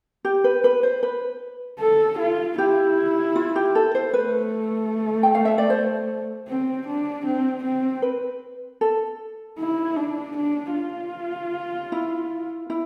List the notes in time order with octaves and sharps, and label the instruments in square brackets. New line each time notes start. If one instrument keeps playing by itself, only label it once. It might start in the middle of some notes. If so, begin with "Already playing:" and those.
[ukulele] G4
B4
B4
C5
B4
[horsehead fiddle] A4
F4
[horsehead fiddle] E4 [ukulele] G4
[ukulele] F4
G4
A4
C5
[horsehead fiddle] A3 [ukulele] B4
[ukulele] G5
F5
E5
D5
C5
[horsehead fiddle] C4
D4
C4
C4
[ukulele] B4
A4
[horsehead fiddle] E4
D4
D4
F4
[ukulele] E4
E4